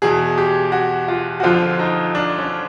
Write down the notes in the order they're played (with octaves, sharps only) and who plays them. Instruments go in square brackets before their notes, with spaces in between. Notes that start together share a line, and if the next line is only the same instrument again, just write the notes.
[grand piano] E2 B2 G#4
G4
F#4
F4
F#4
F2 D3 F3 F4
D#4
D4
C#4